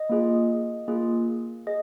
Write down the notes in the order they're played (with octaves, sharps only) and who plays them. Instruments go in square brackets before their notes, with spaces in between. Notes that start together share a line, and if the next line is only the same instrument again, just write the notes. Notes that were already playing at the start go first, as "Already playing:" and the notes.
Already playing: [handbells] D#5
A#3 F4 G#4
A#3 F4 G#4
G#4 D#5